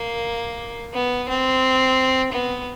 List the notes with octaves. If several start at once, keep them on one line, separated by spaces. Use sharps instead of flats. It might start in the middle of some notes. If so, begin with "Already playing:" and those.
Already playing: A#3
B3
C4
B3